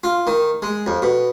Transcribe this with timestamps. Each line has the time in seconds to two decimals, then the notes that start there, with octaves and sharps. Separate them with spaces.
0.04 F4
0.27 D#3
0.62 G#3
0.86 F2
1.02 B2